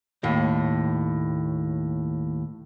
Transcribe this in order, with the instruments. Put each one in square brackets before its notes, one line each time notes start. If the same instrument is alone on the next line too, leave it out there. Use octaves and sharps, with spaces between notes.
[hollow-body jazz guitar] D#2 A2